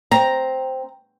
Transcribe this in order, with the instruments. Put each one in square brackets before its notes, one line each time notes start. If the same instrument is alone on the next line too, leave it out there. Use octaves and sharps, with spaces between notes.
[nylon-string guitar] C4 [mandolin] A#5